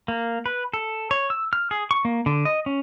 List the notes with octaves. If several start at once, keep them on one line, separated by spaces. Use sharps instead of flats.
A#3
B4
A4
C#5
E6
F6
G#4
C#6
A#3
D3
D#5
C#4